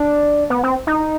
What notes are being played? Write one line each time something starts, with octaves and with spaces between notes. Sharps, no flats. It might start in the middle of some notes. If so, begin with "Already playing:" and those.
Already playing: D4
B3
C4
D#4